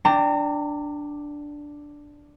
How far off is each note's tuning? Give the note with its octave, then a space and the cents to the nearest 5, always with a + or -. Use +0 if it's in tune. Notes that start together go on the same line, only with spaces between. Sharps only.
D4 +0 G5 +0 A#5 -35